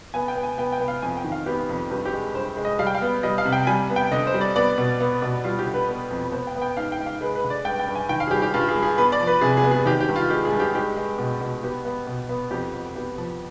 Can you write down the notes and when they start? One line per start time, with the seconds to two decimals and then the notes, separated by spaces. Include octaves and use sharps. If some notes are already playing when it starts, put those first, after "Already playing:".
0.14 B3 G#5
0.28 G5
0.35 B3
0.43 G#5
0.58 B3 G5
0.72 G5
0.80 B3
0.88 F5
1.02 F2 G#5
1.17 G5
1.24 D#3
1.32 F5
1.46 B3 G4
1.69 F2
1.90 G2 G4
2.05 G4
2.13 G#3
2.35 G2 C5
2.57 G#3
2.65 D#5
2.79 G3 F5
2.87 G5
2.95 F5
3.02 B3
3.23 G3 D#5
3.38 F5
3.45 C3
3.53 G5
3.67 G3 G#5
3.90 B3
3.96 G5
4.11 D3 D#5
4.27 C5
4.34 G3
4.41 D5
4.56 B3 D5
4.78 B2
5.00 B3
5.22 B2
5.44 G3 F4
5.59 G4
5.66 D3
5.74 B4
5.88 B3
6.10 F2
6.32 B3 C5
6.47 G5
6.55 B3
6.62 G5
6.77 G#2 F5
6.92 G5
6.99 G#2
7.06 F5
7.21 G#3 B4
7.35 B4
7.44 D3
7.50 D5
7.65 G2 G5
7.79 G5
7.87 G2
7.95 G#5
8.09 D#3 G5
8.20 F5
8.27 G#4
8.31 G3 G4
8.42 G4
8.54 G2 F4
8.68 G#4
8.76 G2
8.82 G#4
8.98 B3 B4
9.12 D5
9.20 F3
9.27 B4
9.41 C3 G#4
9.57 G#4
9.63 B3
9.71 G#4
9.86 D#3 G4
10.01 G4
10.09 G2
10.16 F4
10.30 G#3 G4
10.45 G#4
10.52 G2
10.60 G4
10.74 G#3 G4
10.96 G#3
11.18 B2
11.41 B2
11.63 B3 G4
11.85 B3
12.07 B2
12.29 B3
12.51 F2 G4
12.73 F2
12.96 B3 G4
13.18 F3